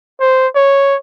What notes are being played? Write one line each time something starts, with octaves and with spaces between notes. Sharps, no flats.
C5
C#5